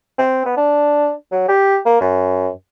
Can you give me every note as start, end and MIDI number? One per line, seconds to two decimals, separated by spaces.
0.18 0.41 60
0.45 0.52 59
0.57 1.12 62
1.32 1.48 54
1.48 1.78 67
1.86 1.99 58
2.01 2.49 42